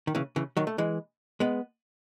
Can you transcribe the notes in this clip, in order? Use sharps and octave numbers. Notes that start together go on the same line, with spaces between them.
D#3
C#3 E3
C#3 E3
D#3 F#3
A3
E3 G#3
G#3 B3